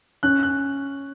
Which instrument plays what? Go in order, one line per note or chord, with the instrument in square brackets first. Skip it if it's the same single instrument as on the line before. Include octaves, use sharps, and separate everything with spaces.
[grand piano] C#4 [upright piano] F#6
[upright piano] F#6